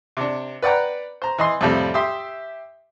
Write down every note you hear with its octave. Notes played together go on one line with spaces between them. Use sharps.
C3 D4
B4 D5 F#5 G5 A#5
C5 A#5
E3 D#5 C6
F2 A2 C3 F3 G3
G4 E5 C6 D#6